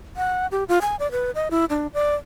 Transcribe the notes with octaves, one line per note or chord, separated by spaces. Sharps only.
F#5
G4
F4
G#5
D5
B4
D#5
E4
D4
D5